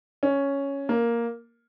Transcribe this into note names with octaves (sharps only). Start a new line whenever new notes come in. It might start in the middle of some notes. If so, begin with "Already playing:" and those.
C#4
A#3